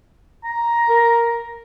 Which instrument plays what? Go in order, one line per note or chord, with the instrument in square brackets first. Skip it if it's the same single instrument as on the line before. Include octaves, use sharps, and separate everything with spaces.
[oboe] A#5
[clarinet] A#4